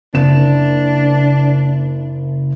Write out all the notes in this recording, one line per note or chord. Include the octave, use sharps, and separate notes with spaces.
F#1 D4 E7